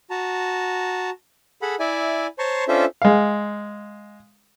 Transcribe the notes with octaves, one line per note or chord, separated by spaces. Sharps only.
F#4 A5 A#5
G#4 A4 F#5 B5
E4 D5 E5 G#5
C5 C#5 A5 A#5 C6 C#6
C#4 D4 F4 A4 C5 E5
G#3 F5